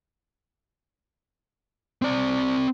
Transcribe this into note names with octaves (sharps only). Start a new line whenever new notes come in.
C4 D5